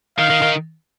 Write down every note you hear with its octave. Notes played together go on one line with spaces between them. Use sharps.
D#3 F5
D#3
D#3